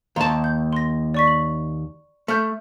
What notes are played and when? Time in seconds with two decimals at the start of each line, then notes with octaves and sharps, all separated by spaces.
0.16 D#2 F5 A5 A#5 C6
0.44 G6
0.73 C6 A#6
1.14 D5 C#6 B6
1.27 F#7
2.28 A3 E5 F6 G6